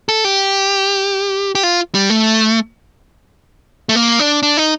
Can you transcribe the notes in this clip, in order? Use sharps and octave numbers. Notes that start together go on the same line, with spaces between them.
A4
G4
G4
F4
G3
A3
A3
A#3
D4
D4
D#4